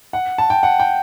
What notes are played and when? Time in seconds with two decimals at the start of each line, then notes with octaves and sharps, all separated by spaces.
0.13 F#5
0.38 A5
0.50 G5
0.63 F#5
0.80 G5